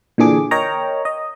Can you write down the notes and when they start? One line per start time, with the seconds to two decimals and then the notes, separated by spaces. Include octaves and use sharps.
0.18 A#2 D3 E3 D4 G#4 D6
0.51 A#4 C#5 D#5 G5 A#5
1.05 D#5